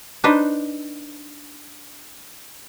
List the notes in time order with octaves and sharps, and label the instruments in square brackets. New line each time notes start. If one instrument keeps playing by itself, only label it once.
[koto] D4 D#4 B4 C5